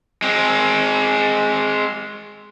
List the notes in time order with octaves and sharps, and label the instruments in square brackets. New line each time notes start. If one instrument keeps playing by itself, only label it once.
[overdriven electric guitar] G#3 C4